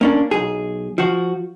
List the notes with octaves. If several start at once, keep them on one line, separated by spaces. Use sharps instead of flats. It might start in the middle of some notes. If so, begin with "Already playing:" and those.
A#3 C#4 D4
B1 G#4
F3 F#4